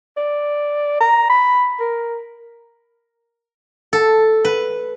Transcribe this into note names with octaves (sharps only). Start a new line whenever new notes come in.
D5
A#5
B5
A#4
A4
B4